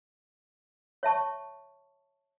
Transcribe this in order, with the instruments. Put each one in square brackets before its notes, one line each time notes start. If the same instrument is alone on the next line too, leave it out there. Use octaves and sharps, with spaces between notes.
[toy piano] C#5 E5 A5 C#6